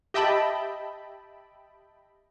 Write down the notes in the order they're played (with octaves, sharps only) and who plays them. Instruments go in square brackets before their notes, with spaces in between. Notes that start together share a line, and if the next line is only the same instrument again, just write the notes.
[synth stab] G4 D#5 E5 G5 A5 B5